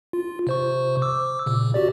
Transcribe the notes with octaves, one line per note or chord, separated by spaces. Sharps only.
F4
C3 C5 C#6
D6 E6
A#2 C#3
F#4 G4 D5